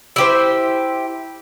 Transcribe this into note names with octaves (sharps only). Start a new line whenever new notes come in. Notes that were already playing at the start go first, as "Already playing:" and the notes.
E4 G4 C5